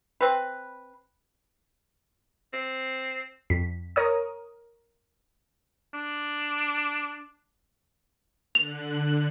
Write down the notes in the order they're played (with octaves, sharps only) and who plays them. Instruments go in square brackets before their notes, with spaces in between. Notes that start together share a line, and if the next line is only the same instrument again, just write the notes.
[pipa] C4 B4
[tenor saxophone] C4
[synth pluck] F2 B6
A#4 C#5 D#6
[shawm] D4
[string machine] D3 F#6 [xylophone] F7